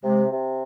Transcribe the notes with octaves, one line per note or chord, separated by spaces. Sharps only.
C3 G#3
C3